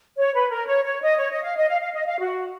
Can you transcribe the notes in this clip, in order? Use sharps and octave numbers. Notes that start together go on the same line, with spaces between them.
C#5
B4
A#4
C#5
C#5
D#5
C#5
D#5
F5
D#5
F5
F5
D#5
F5
F#4